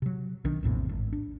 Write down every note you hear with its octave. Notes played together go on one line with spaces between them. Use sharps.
C3 F#3
B1 D#3 D4
A#1 E2 A2 C3
G#1
D4